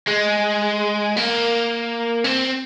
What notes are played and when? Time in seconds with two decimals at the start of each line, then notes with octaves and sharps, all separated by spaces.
0.08 G#3
1.17 A#3
2.24 C4